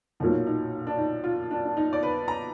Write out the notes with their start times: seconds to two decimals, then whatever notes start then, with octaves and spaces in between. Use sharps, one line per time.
0.20 B1 A#2 F#3 A#3 D#4
0.47 D#4
0.87 D4
0.98 D#4
1.24 F4
1.51 D4
1.65 D4
1.77 D#4
1.93 D5
2.03 B4
2.28 A#5